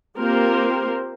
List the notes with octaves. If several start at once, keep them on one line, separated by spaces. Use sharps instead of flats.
A#3 C4 F4 G4 A#4 C5